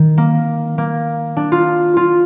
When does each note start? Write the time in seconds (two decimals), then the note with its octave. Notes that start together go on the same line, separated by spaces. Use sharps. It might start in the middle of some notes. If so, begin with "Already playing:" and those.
Already playing: D#3
0.17 A#3
0.78 A#3
1.36 D4
1.52 F4
1.97 F4